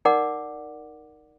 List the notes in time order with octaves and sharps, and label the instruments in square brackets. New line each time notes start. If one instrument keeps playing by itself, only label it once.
[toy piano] D#4 A#4 D5 F#5 D6